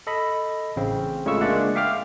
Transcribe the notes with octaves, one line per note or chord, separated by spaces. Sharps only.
A4 D#5 B5
A1 C#3 C4
C#3 G#3 A3 F4 C#6 E6
G#3 A#3 D4 D5 E5 F#5
E5 F5 G5 D6 F6